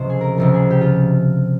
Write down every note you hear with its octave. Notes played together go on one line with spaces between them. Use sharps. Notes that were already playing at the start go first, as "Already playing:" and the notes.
Already playing: C#2 C3 F3 C5
G#4
A#4
C#2 C3 F3 A#4
G#4
G4
F4